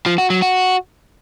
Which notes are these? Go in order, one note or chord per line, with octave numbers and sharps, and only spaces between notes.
F3
F#4
F#3
F#4